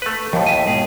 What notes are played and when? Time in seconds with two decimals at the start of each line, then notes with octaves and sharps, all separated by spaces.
0.02 A3 B4
0.33 D#2 A2 F3
0.46 E5 G#5
0.66 G#2 B2 G#4